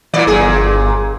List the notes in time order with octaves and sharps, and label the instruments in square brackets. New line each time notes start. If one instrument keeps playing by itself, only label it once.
[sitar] A#2 D5 [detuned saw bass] E3
[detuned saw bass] G1 [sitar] A#2 G#4